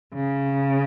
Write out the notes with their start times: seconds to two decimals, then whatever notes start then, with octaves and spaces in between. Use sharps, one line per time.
0.14 C#3